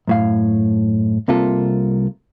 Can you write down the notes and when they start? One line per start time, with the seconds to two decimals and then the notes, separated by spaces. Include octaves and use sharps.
0.07 F#2 A2 F5
1.28 C2 C3 A#3 F4 A4